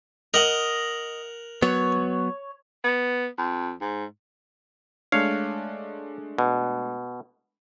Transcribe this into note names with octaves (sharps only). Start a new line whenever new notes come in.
A#4 D#5 F#5
F#3 B3 C#5
B3
F2
G#2
G#3 A3 D4 C#5 F5
B2